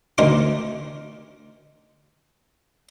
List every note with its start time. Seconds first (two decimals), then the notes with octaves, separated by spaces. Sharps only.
0.18 D2 D#3 A#4 C6 D6